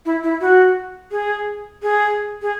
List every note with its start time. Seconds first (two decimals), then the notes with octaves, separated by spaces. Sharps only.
0.06 E4
0.23 E4
0.41 F#4
1.11 G#4
1.82 G#4
2.42 G#4